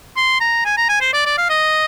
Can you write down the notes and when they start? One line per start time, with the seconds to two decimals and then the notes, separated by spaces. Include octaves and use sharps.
0.16 C6
0.41 A#5
0.65 G#5
0.77 A#5
0.89 G#5
1.01 C5
1.13 D5
1.26 D5
1.38 F5
1.49 D#5